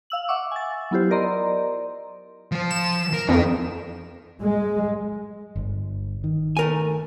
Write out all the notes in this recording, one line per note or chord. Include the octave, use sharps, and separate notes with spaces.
F5 E6 F#7
E5 F#5 C#6 D6 E6
G#5 A6
F#3 B3 E4 F4 G4 C5
A#4 D5 D#5 A#5 C6
F3 C5
E7
A#4
F2 D#4 A#4
G#3
G1
D#3
A3 A#4 G#5